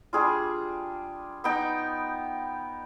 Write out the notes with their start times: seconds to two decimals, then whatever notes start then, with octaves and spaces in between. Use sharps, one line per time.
0.13 G3 D4 F4 G#4
1.44 B3 D#4 G5